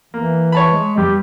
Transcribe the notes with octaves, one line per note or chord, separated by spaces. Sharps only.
E3 A#3
C#5 A5 B5
G#3
G2 G4